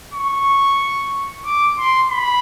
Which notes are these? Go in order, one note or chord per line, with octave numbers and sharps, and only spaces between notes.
C#6
D6
C6
B5